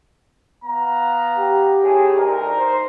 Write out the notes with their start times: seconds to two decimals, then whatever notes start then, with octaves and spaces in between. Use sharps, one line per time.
0.65 B3 F5 A#5
1.37 G4
1.83 A2 G#4
2.18 D2 D#4 A#4
2.57 C5